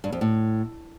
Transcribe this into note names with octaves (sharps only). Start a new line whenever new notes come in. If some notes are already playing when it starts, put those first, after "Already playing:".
G2
F2
A2